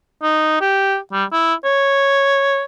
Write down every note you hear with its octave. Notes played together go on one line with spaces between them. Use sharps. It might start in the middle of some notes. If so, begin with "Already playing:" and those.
D#4
G4
G3
E4
C#5